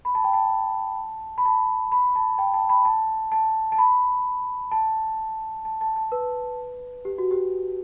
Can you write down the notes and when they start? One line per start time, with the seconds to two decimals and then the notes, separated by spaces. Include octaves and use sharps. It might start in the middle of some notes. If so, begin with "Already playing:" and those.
0.05 B5
0.15 A5
0.24 G5
0.33 A5
1.38 B5
1.46 A5
1.92 B5
2.15 A5
2.38 G5
2.54 A5
2.69 B5
2.85 A5
3.32 A5
3.72 A5
3.78 B5
4.72 A5
5.65 A5
5.81 A5
5.96 A5
6.12 B4
7.05 G4
7.18 F#4
7.31 G4